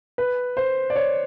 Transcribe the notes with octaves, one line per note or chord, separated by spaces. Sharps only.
B4
C5
D5
C#5